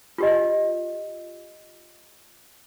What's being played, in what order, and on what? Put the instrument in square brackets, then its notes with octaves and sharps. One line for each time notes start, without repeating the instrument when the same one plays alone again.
[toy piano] F4 G4 D#5